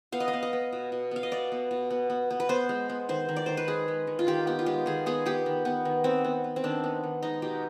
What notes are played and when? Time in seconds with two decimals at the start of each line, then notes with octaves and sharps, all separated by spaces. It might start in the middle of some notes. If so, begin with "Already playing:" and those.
0.12 B3 F5
0.20 D#5
0.28 F5
0.33 B3
0.43 D#5
0.53 B3
0.72 B2
0.92 B2
1.11 B3 F5
1.23 D#5
1.31 B2 D5
1.52 B3
1.71 B2
1.90 B3
2.10 B3
2.30 B3
2.40 B4
2.49 B3 C5
2.69 G#3
2.89 B3
3.09 D#3 C5
3.29 D#3
3.36 D5
3.46 D#3 C5
3.57 B4
3.67 G#3 G#4
3.88 G#3
4.07 D#3
4.19 F4
4.27 D#3 G4
4.47 B3 G4
4.59 F4
4.66 G#3 G4
4.86 D#3 G#4
5.06 B3 G#4
5.26 B3 G4
5.46 D#3
5.65 B3
5.85 D#3
6.04 B3 C4
6.24 B3
6.44 B3
6.56 C4
6.64 D#3 D4
6.84 B3
7.03 D#3
7.22 G#3 D#4
7.42 B2 G4